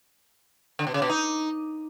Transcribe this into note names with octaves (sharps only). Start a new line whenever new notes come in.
D3
B2
C#3
B2
D#4